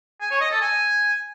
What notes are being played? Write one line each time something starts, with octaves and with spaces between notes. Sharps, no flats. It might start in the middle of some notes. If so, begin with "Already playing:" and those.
G#5
C#5
D#5
A4
G#5